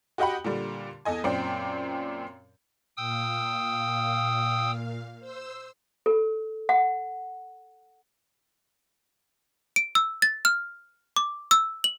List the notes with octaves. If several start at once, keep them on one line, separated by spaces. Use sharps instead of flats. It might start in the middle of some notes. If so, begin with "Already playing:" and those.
F#4 G4 D#5 F#5 G5 B5
A#2 D3 G3
E2 A4 D#5 G#5
F#2 A#2 C4 D5 G5
A#2 F5 G5 D#6 E6
C5 E6
A4
F#5
D7
E6
A6
F6
D6
E6
F#7